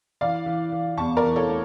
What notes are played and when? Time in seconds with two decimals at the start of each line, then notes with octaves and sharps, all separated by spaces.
0.21 E3 D5 F5
0.46 E3
0.72 E3
0.98 E2 A5 C#6
1.17 A#4 D5
1.23 E3
1.36 A4 C#5
1.49 A3